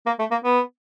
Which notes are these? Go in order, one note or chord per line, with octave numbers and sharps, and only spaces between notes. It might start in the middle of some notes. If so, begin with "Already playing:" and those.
A#3
A3
A#3
B3